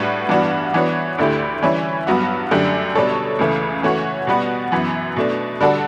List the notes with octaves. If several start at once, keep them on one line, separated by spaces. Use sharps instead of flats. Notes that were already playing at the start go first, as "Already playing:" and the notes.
Already playing: A2 G3 D4 F#4 B4
G2 E3 B3 D4 F#4
E3 B3 D4 F#4 C#5
D2 D3 A3 E4 G4
E3 G3 C#4 E4
G2 F#3 B3 F#4
F#2 D3 A3 D4 G4
B2 G3 D4 A4 C#5
C#2 C#3 E3 A3
E3 A3 C#4 F#4 C#5
B2 G3 B3 F#4
F#2 E3 B3
B2 A3 D4
D3 G3 D4 F#4 A4